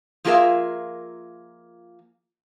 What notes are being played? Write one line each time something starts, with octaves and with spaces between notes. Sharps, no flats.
F3 A#3 F4 G#4 A#4 E5